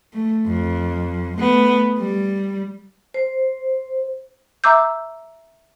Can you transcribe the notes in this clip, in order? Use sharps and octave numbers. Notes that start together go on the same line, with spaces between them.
A3
F2
A3 B3
G3
C5
E5 A#5 D6 E6 G6